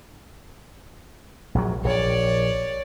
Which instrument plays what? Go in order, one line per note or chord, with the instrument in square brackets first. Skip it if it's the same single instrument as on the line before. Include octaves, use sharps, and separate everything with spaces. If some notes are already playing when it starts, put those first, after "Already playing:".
[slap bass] A#1 F#3
[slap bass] A#1 [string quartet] C#5 D5